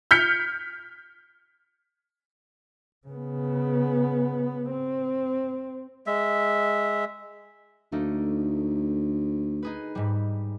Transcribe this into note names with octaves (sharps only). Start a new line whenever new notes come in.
F6 G6 B6 C#7
C#3 B3
C4
G#3 E5
D2 A3 A#3 D#4
D#4 G#4 B4
G#2 G3